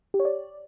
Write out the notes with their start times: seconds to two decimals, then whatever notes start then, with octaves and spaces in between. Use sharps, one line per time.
0.14 G4
0.20 C#5
0.25 D5